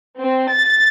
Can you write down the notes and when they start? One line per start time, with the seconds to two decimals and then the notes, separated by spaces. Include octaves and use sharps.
0.17 C4
0.52 A6